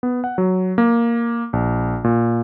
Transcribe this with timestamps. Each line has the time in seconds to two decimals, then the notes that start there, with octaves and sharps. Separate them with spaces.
0.03 B3
0.24 F#5
0.38 F#3
0.78 A#3
1.53 A#1
2.04 A#2